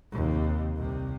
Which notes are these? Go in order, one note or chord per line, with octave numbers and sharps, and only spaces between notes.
D#2 C3
C2 C3